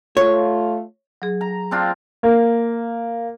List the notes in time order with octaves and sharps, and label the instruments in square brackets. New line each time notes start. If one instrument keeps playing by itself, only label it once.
[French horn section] A3 F4 [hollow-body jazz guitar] C#5
[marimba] F#3 G#4
[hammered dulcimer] A#5
C4 D4 F4
[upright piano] A#3